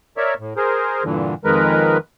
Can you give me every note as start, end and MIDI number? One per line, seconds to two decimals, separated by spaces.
0.17 0.34 70
0.17 0.34 73
0.17 0.34 74
0.17 0.34 76
0.39 0.54 45
0.56 1.03 68
0.56 1.03 70
0.56 1.03 72
1.04 1.34 43
1.04 1.34 46
1.04 1.34 50
1.04 1.34 52
1.44 1.97 41
1.44 1.97 51
1.44 1.97 56
1.44 1.97 70
1.44 1.97 71